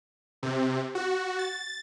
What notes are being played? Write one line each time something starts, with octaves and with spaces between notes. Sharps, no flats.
C3
F#4
A6